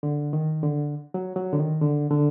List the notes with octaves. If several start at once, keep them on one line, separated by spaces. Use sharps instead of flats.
D3
D#3
D3
F#3
F#3
D3
D#3
D3
D3